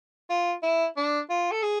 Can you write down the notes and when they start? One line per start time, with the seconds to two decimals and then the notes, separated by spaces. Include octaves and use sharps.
0.30 F4
0.63 E4
0.97 D4
1.30 F4
1.51 A4
1.63 G#4